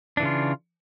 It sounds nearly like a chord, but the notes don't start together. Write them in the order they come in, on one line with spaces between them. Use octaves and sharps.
D4 E3 C#3 F4